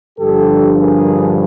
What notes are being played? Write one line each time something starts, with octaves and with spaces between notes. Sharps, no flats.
G2 D3 F3 G4 A4
G#4 A#4